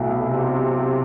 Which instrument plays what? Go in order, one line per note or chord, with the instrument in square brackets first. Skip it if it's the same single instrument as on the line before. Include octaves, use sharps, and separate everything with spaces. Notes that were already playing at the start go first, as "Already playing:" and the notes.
Already playing: [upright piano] B1 B2 A3 E4
[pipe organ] C3